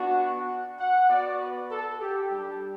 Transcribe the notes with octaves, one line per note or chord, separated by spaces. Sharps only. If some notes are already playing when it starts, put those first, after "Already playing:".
Already playing: B3 D4 F#4
F#5
F#5
B3 F#4 D5
B4
A4
G4
G3 D4 G4 A4